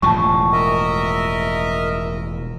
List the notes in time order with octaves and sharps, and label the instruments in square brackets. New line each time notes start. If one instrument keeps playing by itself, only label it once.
[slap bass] E1 A2 F3 [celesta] A5 C#6
[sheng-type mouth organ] A#4 D#5 E5